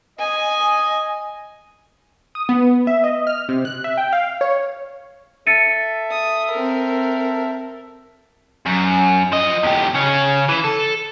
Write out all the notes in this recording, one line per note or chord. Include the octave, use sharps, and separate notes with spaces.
D#5 G#5
D#6
B3
E5
D#5
F6
C3
F#6
E5
G5
F5
C#5
A4 E5 A6 C#7 D#7
D#6
C4 A#4
F#2
F3 D#5
E2 G4
C#3 C#4
E3
A4